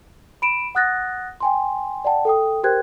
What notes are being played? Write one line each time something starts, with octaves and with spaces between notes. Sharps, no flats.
B5 D7 E7
F#5 D#6 F#6 A6 A#6
G5 G#5 C6
D5 F#5 G5 A5
A4 G5 D#6
G4 A#4 C5 G5 F#6 G#6